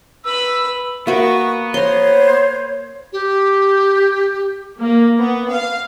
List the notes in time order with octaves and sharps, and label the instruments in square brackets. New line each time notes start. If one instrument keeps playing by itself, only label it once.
[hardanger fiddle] B4 B5 [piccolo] E6
[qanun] A#3 F#4 [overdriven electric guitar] B3 [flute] C#6
[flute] C5 [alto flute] C#5 [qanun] A#5 C6
[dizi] G4
[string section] A#3
B3
F5